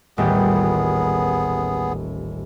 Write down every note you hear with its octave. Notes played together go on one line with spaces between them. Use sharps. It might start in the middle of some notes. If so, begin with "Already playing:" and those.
D#1 A1 B3 G#4 G5